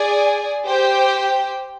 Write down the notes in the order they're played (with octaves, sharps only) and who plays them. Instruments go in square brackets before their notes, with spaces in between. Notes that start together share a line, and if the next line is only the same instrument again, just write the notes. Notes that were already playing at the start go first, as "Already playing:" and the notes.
Already playing: [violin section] G#4 D5 G#5
G4 C5 G5